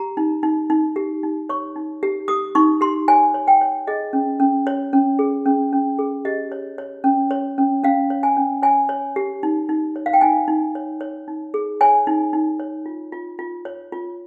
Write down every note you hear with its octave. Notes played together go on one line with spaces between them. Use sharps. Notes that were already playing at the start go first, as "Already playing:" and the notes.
Already playing: G4 A#5
D#4
D#4
D#4
G4
D#4
C#5 C#6
D#4
G4
G4 D#6
D#4 C#6
G4 C6
C#5 G#5
C#5
G5
C#5
G#4 D#5
C#4
C#4
C#5
C#4
G#4
C#4
C#4
G#4
G4 D#5
C#5
C#5
C#4
C#5
C#4
C#4 F5
C#5
G#5
C#4
C#5 G#5
C#5
G4
D#4
D#4
C#5
F5
G5
D#4 G#5
D#4
C#5
C#5
D#4
G#4
C#5 G#5
D#4
D#4
C#5
F4
F4
F4
C#5
F4